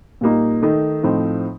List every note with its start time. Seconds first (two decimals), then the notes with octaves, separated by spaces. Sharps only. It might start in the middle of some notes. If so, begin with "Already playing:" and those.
0.21 A#2 G3 A#3 D#4
0.62 D#3 A3 D#4
1.03 A2 F3 C4 D#4